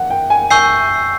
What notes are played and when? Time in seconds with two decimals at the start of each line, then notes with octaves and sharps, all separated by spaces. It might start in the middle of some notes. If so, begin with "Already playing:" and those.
Already playing: F#5
0.10 G5
0.30 G#5
0.51 G#5 C#6 E6 G6 C7